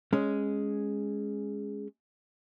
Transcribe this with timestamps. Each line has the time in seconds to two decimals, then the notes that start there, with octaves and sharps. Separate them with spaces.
0.13 G#3 C#4